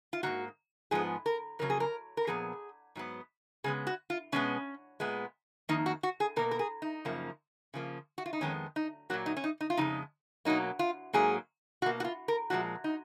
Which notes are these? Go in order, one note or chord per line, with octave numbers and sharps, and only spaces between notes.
F4
G#2 D#3 A#3 F#4
G#2 F3 G#3 B3 G#4
A#4
F2 C#3 F#3 A#3 A#4
G#4
A#4
A#4
A#2 F3 B3 G#4
G#2 F#3 B3
C#3 G#3 B3 G#4
F#4
F4
B2 G#3 B3 C#4
A#2 G#3 B3
F2 D#3 A#3 D#4
F#4
F#4
G#4
B2 A#3 A#4
A#4
G#4
D#4
F#2 C#3 F3 A#3
C#3 F3 A#3
F#4
F4
D#4
F2 D#3 G#3 B3 C#4
D#4
A#2 F#3 A#3 F#4
D#4
C#4
D#4
D#4
F4
F2 C#3 G#3 D#4
B2 F#3 A#3 D#4
F4
G#2 F#3 A#3 G#4
B2 A#3 F#4
F#4
F4
A#4
A#2 F3 G#3 F#4
D#4